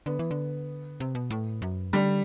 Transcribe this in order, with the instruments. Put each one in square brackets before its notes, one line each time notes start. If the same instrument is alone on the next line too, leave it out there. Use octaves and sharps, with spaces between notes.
[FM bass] D3 [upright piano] B3
[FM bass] E3
D3
C3
B2
A2
F#2
[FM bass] D3 [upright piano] G3